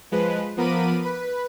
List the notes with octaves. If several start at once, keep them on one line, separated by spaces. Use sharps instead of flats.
F3 G#3 B4
F3 B3 A#4 B5 D6 D#7
B4